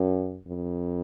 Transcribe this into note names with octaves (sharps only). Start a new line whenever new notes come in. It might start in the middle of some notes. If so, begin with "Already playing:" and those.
Already playing: F#2
F2